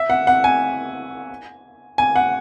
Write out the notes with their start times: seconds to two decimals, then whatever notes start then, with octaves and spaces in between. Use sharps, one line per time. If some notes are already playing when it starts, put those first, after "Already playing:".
Already playing: E5
0.10 F#5
0.27 F#5
0.44 G#5
1.98 G#5
2.16 F#5